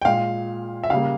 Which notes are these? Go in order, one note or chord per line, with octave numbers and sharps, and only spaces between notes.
G5
A#2 G#3 F5
E5
C#3 G3 A#3 F5